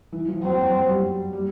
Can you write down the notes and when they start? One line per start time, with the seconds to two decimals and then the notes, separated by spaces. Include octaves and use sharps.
0.12 E3
0.28 F3
0.43 F#3 C4
0.57 F#3
0.73 F#3
0.88 G3
1.33 G3